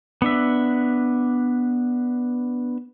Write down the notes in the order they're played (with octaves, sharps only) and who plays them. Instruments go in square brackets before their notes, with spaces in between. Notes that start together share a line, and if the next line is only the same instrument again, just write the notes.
[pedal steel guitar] B3 D4 E5